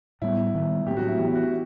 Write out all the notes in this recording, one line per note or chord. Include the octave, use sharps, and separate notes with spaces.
A2 G3 B3 E4
D#3 G3 B3
A2 F#3 A3 C4 G4
F#4
E4
E3 B3 G4
E4
F#4
E4